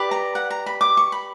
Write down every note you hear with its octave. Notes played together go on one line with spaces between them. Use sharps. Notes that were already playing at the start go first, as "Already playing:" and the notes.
Already playing: G4 B4 D5
A#5
F#5
A#5
B5
D6
C#6
B5